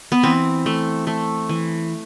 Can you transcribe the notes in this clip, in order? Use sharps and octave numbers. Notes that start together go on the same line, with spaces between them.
B3
E3 C4
A3
A3
E3